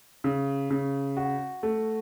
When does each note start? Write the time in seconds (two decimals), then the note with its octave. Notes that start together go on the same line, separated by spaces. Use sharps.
0.24 C#3
0.70 C#3
1.17 F#4
1.63 A3